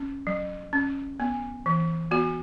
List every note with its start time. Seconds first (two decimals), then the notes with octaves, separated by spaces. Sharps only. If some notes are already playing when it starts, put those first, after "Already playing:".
Already playing: C#4
0.27 F#3
0.73 C#4
1.20 B3
1.66 E3
2.11 B3 F#4